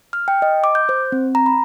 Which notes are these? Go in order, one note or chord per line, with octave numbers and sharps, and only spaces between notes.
F6
G5
D#5
D6
G6
C5
C4
A#5
B5